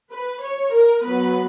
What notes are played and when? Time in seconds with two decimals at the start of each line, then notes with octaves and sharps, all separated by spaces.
0.11 B4
0.42 C#5
0.72 A#4
1.04 F#3 B3 B4